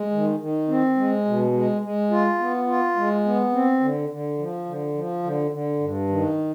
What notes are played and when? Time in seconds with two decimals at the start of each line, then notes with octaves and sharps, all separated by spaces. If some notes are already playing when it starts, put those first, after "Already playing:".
Already playing: G#3
0.12 D#3
0.40 D#3
0.68 C4
0.97 G#3
1.26 B2
1.53 G#3
1.82 G#3
2.11 F4
2.39 B3
2.67 F4
2.96 G#3
3.25 B3
3.52 C4
3.81 D3
4.09 D3
4.38 F3
4.66 D3
4.94 F3
5.23 D3
5.51 D3
5.80 G2
6.08 D#3